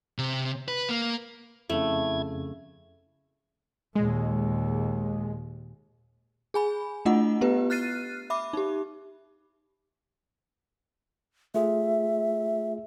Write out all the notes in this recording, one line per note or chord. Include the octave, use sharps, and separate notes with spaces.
C3
B4
A#3
F2 C#3 A3 E4 G#6
D#2 A#2 G#3
G#4 G#5 B5
A3 D4 E4 F4 D#5 F#5
B3 G4 B4
F6 F#6 A6 C7 D#7
E5 B5 D6
D#4 G4
A3 F4 G#4 E5